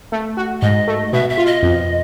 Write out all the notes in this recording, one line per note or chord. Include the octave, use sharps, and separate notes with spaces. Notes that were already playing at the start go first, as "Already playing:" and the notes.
A3
F#4
G#2 D#5
A3
B2 E5
E5
F4
D#5
F2